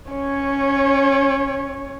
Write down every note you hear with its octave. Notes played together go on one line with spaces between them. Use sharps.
C#4 C#5